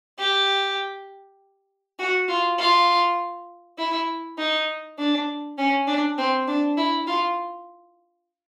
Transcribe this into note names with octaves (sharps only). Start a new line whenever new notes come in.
G4
F#4
F4
F4
E4
D#4
D4
C#4
D4
C4
D4
E4
F4